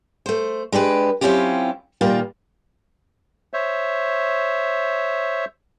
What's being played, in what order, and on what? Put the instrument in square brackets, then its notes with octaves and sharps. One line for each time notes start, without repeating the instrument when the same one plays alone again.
[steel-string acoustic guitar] A3 C5
G#3 D4 G4 B4
F#3 C4 C#4 E4 F4 G4
A#2 D#3 G3 A#3 F4
[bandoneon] C5 C#5 E5